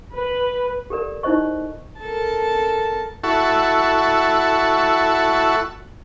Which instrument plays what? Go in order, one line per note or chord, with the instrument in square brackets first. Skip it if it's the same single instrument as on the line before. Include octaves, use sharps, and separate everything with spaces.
[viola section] B4
[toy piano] G4 A4 A#4 D5
D#4 E4 A#4 C5 D#5 C#6
[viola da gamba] A4 [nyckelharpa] A#4 A5
[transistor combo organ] E4 F#4 A4 C#6